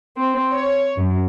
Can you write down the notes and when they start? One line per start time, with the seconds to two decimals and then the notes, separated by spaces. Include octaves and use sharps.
0.17 C4
0.53 C#5
0.97 F#2